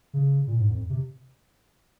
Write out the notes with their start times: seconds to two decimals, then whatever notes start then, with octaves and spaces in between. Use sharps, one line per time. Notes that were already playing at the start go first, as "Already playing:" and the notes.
0.14 C#3
0.47 A#2
0.59 G#2
0.70 F2
0.90 C3